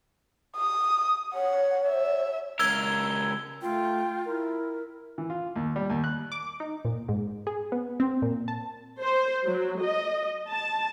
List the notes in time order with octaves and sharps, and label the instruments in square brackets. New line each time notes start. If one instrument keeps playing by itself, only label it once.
[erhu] D#6
[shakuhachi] C#5 [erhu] F#5
[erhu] E5
[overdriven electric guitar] C#2 A#4 [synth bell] E6 G#6 G7
[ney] A3 [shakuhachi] F4 [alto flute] G5
[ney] E4 [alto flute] A#4
[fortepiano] E3
F4
D#2
G3
D#2
F#6
[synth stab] D6
D#4
A#2
G#2
G#4
B3
C4
A#2
A5
[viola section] C5
F#3
D#5
A5